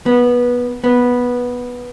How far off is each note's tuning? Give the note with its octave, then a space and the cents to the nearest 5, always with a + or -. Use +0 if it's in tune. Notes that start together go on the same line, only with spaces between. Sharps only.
B3 -15
B3 -10